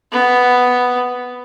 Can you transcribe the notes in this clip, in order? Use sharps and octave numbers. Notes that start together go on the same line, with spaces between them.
B3